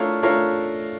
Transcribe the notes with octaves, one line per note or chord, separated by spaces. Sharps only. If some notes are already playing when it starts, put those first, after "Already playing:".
Already playing: A3 D4 F4 A#4 C#5
A3 D4 F4 A#4 C#5